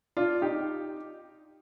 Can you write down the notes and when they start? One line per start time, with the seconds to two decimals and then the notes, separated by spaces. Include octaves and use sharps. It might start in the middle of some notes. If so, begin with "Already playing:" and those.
0.17 D4 F4
0.42 D#4 G4